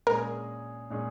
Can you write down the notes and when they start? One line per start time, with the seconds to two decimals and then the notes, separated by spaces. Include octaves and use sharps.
0.07 A#2 G#3 C#4 G#4 A#4
0.90 A#2 G#3 C#4 G#4